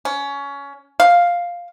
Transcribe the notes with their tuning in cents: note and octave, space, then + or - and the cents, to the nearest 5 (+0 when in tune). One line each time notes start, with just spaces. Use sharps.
C#4 +20
F5 +5